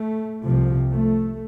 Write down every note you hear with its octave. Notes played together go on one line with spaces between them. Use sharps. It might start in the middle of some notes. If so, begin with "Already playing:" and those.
Already playing: A3
C2 C3 F3
A3